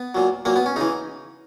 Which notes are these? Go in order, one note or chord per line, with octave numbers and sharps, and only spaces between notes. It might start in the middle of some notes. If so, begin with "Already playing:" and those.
Already playing: B3
A#2 F#3
A#2 F#3 A#3
B3
C#4
C#3 E3 D#4